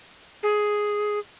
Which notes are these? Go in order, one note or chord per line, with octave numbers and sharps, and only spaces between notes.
G#4